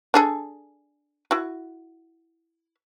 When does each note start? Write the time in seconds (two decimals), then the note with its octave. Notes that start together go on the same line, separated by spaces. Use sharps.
0.14 D4 G#4 A4
1.31 E4 F#4